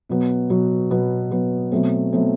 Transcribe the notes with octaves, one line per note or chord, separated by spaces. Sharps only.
B2 F#3 B3
B2 F#3 B3
B2 F#3 B3
B2 F#3 B3
B2 F#3 A3 C4
B2 F#3 A3 C4